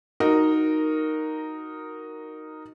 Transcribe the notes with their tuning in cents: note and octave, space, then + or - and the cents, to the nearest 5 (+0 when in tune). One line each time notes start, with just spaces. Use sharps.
D#4 +0 F#4 +0 A#4 +0